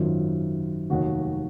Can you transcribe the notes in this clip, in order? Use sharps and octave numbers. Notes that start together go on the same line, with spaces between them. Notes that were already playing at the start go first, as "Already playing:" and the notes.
Already playing: G#1 F#2 D#3 F#3 F4
F1 D#2 D#3 F#3 F#4